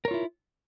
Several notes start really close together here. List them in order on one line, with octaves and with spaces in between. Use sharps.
A#4 C#5 F4 E4